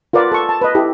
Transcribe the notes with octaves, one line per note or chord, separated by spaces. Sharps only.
F4 A#4 B4 D5 F#5
A4 C#6
A5
B4 D#5
E4 G4 A4